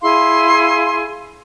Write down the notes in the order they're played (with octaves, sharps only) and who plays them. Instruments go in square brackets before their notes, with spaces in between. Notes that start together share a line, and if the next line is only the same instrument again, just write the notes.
[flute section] E4 G#4 F5 C6